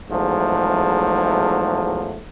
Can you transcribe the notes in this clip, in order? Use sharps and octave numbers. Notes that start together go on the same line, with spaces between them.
E2 G#2 F3 F#3 A3